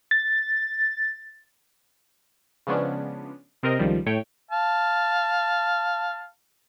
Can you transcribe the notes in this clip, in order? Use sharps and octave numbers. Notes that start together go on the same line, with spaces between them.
A6
C#3 F3 G#3 B3 C#4 D4
C3 C4 A#4 D#5 A#6
C#2 D#3 F3 G3
A2 A3 C#5 G5
F5 A5